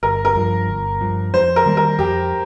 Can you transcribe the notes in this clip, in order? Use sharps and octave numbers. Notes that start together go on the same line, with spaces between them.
G1 A#4
A#4
G2 F3
G1
G2 F3
F2 C5
A#4
D#3 G3 A#3
A#4
F2 G4